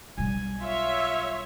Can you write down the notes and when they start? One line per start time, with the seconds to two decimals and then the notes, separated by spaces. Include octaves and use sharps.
0.18 B1 G3 G#5
0.61 F4 C#5 E5